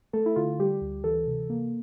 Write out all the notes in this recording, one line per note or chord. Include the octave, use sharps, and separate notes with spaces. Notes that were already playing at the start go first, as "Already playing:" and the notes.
A3 A4
E4
D3 F4
G3 G4
D2
E3 A4
C3
A#3